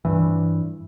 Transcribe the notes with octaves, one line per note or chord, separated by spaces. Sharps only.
G2 E3